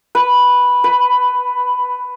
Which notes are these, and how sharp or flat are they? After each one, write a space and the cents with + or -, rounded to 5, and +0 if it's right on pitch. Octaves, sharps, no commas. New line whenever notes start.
B4 -5
B4 +10